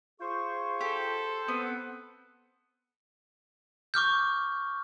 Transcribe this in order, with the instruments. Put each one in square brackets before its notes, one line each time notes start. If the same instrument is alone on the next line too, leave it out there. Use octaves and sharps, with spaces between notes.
[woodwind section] F4 G#4 C#6 [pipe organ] C5
[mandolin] G4 [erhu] A4
[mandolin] B3 [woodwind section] C4
[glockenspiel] C#6 D6 F6 G6